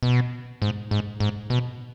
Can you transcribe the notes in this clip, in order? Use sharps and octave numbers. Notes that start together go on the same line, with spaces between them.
B2
G#2
G#2
G#2
B2